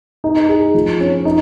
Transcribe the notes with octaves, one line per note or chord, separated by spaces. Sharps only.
D#4
G#4
F3
C#4
D#4